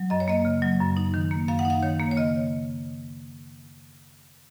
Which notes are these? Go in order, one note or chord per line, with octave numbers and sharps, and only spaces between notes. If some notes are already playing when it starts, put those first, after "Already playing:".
Already playing: F#3
F#2 D#5
C#5
A#3 D#5
C#3
F#3
F#2
D#4
D#3
A#3
F#2 F5
F#5
D#4
F5
D#3 C#5
A#3
C#5
C#3 D#5